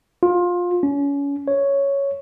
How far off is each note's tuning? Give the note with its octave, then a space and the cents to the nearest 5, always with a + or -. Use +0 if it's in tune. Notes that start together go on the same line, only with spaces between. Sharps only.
F4 +20
C#4 +30
C#5 +5